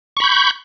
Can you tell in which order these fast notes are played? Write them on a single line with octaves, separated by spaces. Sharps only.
C#6 B5 G6